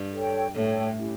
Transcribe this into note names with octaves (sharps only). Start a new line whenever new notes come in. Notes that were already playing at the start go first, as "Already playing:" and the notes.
Already playing: G2
A4 C#5 G5
A2 A4 C#5 G5
C#4 E4 G4